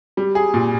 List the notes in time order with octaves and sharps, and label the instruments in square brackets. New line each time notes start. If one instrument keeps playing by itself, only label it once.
[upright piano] G3
G#4
A#2